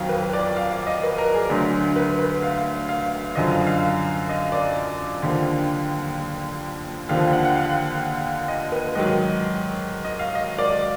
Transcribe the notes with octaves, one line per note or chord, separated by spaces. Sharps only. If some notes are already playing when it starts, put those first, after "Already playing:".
Already playing: F2 D#3 F#3 F5
B4
D5
F5
F5
D#5
B4
A#4
G#4
D2 D3 F#3
B4
B4
F5
F5
F#2 D3 F3 D#5
F5
F5
D#5
D5
D#2 D3 F3
D#2 D3 F3 F5
F#5
F#5
F5
D#5
B4
G#2 D#3 F#3 D#5
D#5
F5
D#5
D5